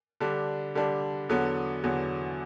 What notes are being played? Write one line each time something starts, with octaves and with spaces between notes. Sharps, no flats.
D3 G3 D4
D3 G3 D4
E2 D3 F#3 B3
E2 D3 F#3 B3